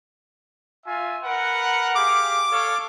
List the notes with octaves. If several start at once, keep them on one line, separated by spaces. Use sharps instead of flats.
F4 E5 G#5
A#4 B4 F#5
G4 G#4 F5 D6
A4 C#5 F5